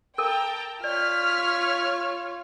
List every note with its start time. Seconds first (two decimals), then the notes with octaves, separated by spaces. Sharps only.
0.18 A4 A#4 G5 A5 A#5
0.84 F4 C#5 D5 F6 B6